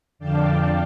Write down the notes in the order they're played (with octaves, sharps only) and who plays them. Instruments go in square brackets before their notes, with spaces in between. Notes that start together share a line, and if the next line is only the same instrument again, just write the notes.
[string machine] F2 D3 D5 F5 G5 A5